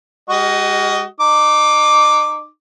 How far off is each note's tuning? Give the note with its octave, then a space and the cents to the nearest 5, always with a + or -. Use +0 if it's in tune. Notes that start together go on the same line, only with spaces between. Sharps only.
G#3 -30 F#4 +30 D#5 +0
D#4 -35 D6 +0